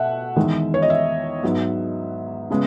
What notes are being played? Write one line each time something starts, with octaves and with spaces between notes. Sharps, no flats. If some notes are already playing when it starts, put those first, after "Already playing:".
Already playing: B2 A3 E5 F#5
E2 D#3 G#3
C#5
D#5
E5
G#2 F#3 B3
C#3 G#3 B3